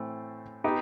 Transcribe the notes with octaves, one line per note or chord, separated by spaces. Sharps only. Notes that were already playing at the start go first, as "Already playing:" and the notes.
Already playing: A2 E3 A3 C4
B3 D#4 G4